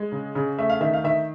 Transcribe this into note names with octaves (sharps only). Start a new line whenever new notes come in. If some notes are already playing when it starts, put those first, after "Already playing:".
Already playing: G#3
C#3
C#3
A3 E5
F5
D#3 E5
F5
D#3 E5